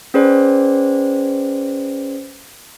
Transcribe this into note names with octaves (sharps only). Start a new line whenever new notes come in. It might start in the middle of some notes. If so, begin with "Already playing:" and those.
C#4 G#4 B4 C5 D5